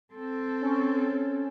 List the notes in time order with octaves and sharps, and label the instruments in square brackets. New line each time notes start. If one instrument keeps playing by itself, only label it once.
[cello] C4 A4
[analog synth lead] C#4